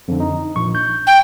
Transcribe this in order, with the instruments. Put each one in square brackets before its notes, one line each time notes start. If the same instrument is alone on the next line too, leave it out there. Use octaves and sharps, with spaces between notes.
[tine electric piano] F2 D3
D#4
A#1 C#6
G6
[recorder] G5